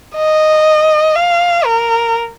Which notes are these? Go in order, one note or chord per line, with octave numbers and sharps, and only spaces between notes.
D#5
F5
A#4